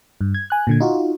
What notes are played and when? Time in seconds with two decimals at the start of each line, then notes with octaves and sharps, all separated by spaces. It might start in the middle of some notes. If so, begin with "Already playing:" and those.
0.21 G2
0.34 G#6
0.50 G#5 F#6
0.67 A#2 D3 G#6
0.80 D#4 F4 F#4